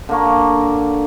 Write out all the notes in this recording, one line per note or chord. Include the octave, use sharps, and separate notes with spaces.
D3 A#3 C#6